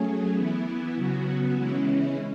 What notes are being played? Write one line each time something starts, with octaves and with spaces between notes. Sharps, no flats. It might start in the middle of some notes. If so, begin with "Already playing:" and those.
Already playing: F#3 A3 C#4 G#4
E3 B3 E4
C#3 F#3 B3 F#4
C#3 E3 G#3 C#4 E4